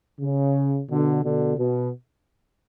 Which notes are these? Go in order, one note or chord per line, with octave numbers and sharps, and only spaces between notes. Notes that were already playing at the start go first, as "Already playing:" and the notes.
C#3
B2 D3
B2 D3
B2